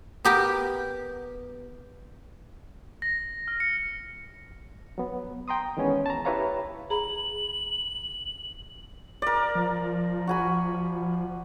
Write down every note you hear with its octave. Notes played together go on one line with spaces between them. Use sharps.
B3 G4 A#4
A#6
F6
C#7
F#3 B3
G5 A#5 C6 D#6
D#3 E3 G#3 B3 C#4
A5 A#5
E4 G4 B4 C#5 F5 A#5
G#4 A#5 B5 F#7
A#4 D5
F3
F#4 G#5 B5